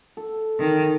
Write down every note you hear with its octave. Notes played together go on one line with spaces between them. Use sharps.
A4
D#3